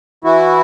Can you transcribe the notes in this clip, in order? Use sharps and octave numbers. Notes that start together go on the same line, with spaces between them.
E3 E4 F#4